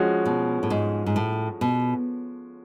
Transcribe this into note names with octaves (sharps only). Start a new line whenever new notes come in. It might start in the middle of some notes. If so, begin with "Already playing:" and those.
Already playing: F3 G#3 C#4 F#4
B2
A2
G#2
G#2
A2
B2